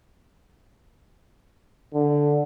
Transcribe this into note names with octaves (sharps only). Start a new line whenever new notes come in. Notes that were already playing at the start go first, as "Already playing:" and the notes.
D3